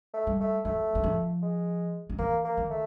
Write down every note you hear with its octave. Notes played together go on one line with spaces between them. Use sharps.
A3
G3
A3
F#3 A3
E3
F3
G#3
F3
E3 A#3
A#3
D#3
A3